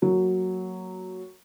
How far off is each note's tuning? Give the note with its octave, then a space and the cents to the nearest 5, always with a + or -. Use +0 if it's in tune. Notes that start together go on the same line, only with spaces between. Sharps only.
F#3 +0 A#3 -10